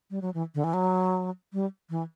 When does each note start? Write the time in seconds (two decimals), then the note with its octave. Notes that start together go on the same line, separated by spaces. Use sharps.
0.11 G3
0.22 F#3
0.34 E3
0.55 D3
0.64 E3
0.74 F#3
1.53 G3
1.90 E3